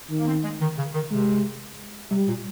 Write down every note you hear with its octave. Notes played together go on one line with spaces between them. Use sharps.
D#3
A#3
C4
G#3
D#3
C#3
D#3
C3 G#3
C3 G3
A#2